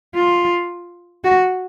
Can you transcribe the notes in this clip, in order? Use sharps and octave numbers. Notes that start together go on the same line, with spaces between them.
F4
F#4